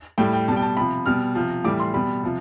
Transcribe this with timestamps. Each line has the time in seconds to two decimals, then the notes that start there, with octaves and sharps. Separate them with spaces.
0.18 A2 G3 G5
0.33 G5
0.48 B2 A5
0.52 G3 G5
0.62 A5
0.77 C3 F3 B5
1.06 B2 G3 F6
1.35 C3 F3
1.64 A2 E3 G3 D6
1.80 C6
1.93 B2 G3 B5
2.23 C3 F3